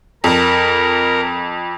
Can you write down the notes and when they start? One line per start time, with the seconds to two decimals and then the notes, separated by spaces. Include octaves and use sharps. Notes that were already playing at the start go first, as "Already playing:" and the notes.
0.24 F2 A#4